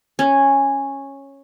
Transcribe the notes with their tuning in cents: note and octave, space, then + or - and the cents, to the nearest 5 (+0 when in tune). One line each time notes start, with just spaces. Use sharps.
C#4 -10